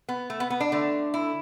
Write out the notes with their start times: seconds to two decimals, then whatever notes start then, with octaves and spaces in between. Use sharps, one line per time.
0.08 B3
0.30 A3
0.40 B3
0.50 B3
0.60 D4
0.72 D3 A3
1.14 E4